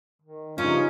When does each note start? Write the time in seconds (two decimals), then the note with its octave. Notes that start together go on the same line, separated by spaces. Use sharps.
0.22 D#3
0.58 G2 C#3 F3 C#4 D#4 F4